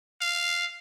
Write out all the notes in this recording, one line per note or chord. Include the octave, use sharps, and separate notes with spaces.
F5